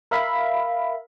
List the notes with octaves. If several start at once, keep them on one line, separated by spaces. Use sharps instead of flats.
A#4 E5 F5 B5